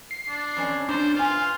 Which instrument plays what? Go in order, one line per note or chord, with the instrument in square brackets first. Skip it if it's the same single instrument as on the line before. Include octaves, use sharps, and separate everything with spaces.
[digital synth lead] C7
[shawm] D4
[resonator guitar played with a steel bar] F2 C#4 D5
[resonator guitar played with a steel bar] F2 A#3 C#5 [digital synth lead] D4 [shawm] C5
[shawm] F4 [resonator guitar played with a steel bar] B4 G#5 [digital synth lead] C6